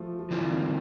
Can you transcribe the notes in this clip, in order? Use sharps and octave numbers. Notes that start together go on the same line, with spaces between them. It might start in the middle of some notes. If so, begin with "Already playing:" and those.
Already playing: F3 A3
F3
D3 E3 G3 C4 F4
D#3